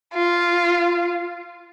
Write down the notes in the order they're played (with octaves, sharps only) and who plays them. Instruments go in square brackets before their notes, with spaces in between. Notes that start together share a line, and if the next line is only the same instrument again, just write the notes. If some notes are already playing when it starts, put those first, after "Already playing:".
[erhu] F4